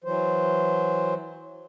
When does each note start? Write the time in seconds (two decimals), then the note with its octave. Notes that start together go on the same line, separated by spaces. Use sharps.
0.04 E3 F#3 C5